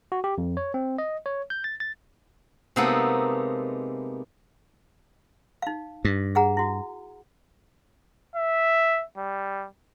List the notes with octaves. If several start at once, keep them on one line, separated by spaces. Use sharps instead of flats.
F#4
G4
F2
C#5
C4
D#5
C#5
G6
A6
A6
C3 G#3 A#3 B3 D#4 A4
D#4 F5
G2
G#4 F#5 A#5
E4 F#4
E5
G3